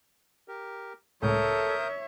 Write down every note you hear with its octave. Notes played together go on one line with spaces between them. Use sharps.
G4 A#4
C#2 A2 A4 A#4 C#5 E5 D#6 G6